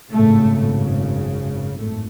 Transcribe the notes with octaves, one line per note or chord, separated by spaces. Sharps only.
G#1 F#2 A2 C#3 A3
G#1 F#2 A2 A3